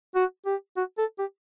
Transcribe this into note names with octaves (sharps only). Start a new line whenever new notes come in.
F#4
G4
F#4
A4
G4